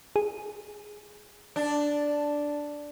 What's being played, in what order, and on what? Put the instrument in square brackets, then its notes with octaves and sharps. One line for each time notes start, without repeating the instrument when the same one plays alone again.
[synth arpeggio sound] G#4
[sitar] D4